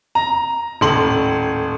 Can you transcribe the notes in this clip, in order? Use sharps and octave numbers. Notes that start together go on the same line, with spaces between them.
A#5
D#1 A2 C6 F#7